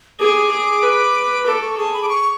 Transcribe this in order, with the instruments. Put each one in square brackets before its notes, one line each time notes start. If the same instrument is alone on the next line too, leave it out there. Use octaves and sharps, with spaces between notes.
[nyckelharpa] G#4 [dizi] D6
[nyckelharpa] G#4
B4
[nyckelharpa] A4 [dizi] D6
[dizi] C#6
[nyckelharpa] G#4 [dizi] A5
[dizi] B5
D6
C#6